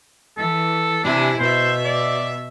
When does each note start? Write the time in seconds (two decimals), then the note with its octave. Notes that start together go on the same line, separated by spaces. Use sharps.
0.38 E3 A4
1.04 C3 D4 E4 G#5
1.38 B2 C5 E5
1.85 D5